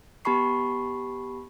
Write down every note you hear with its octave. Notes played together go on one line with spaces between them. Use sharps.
B3 G4 A5 B5 C#6 C7